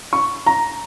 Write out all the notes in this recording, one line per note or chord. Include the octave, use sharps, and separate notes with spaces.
C#6
A#5